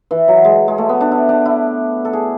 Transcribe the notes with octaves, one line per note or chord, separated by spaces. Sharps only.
E3
F#3
G#3
G#3
A3
B3
D4
E4
D4
E4
A4
G#4